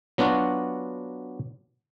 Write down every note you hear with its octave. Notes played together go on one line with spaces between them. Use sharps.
F#3 B3 D4 F4 F#4